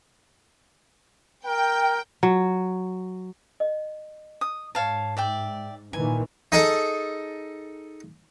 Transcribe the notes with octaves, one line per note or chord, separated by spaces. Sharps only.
A#4 G5
F#3
D#5
D#6
G#2 C#5 F5 A5
D5 E5 G5
A#2 D#3 E3 G#5
D#4 G#4 A4